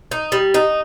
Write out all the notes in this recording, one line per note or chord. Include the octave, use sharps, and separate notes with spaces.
D#4
G3
D#4